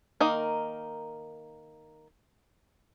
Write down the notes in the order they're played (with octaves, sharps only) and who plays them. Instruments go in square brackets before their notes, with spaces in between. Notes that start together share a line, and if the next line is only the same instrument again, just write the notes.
[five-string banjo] D#3 A#3 D#4 A#4